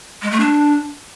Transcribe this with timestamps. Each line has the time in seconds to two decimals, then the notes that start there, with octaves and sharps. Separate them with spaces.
0.22 G#3
0.31 A3
0.40 D4